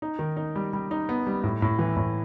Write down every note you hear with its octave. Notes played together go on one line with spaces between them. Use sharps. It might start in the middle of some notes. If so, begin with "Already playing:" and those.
D#4
D#3
D#4
G3
G3
D#4
B3
G3
A2
A2
E3
A2